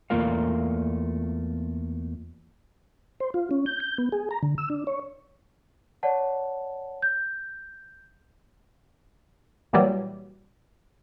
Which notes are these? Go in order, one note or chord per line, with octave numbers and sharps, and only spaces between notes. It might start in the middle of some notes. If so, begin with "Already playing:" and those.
E2 A3 A#3 F4 A#4 F5
C5
F4
C#4
G6
G6
B3
G#4
A#5
D3
E6
D4
C#5
C#5 D5 F#5 A5
G6
A#2 E3 F#3 G3